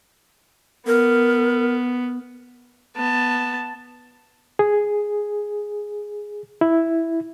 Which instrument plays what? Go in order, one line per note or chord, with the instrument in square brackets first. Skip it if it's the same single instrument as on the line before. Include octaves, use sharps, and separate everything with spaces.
[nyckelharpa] B3 [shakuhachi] A#4
[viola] B3 A5
[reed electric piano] G#4
E4